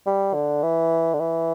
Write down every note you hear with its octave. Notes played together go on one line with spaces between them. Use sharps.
G3
D3
E3
D3
E3